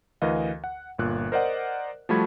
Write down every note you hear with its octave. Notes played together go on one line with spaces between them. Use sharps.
D2 E3 A#4 D#5 F5
F#5
G1 A#2 F#6
A#4 C5 D5 D#5 F#5
F3 G3 A3 F#4 B5 G#6